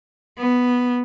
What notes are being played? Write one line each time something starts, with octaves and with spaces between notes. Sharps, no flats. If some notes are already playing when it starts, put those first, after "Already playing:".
B3